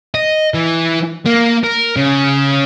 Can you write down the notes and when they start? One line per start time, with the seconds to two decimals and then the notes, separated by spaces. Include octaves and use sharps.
0.14 D#5
0.54 E3
1.26 A#3
1.64 A#4
1.97 C#3